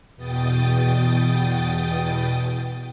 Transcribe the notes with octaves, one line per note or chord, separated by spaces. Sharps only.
E2 B2 G5 D#6 A6